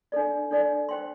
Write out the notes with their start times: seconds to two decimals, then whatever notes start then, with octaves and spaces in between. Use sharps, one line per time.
0.12 D4 A4 D5
0.51 D4 A4 D5
0.89 C5 G5 C6